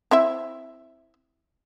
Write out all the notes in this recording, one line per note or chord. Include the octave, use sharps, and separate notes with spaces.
C4 E4 E5